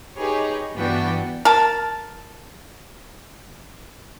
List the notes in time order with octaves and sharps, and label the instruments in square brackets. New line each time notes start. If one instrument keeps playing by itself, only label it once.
[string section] D#4 G4 G#4 B4 C#5
G2 E3 B3 D4 F#4 G5
[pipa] A#4 A5